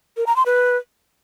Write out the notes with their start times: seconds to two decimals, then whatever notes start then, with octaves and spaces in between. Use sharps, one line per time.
0.17 A#4
0.27 A#5
0.36 C6
0.46 B4